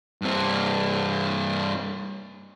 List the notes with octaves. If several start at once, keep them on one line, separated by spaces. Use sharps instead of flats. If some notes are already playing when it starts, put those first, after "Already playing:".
G2 C4